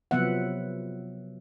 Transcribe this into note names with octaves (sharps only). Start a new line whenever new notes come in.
C3 F3 F#3 B3 E5 F#5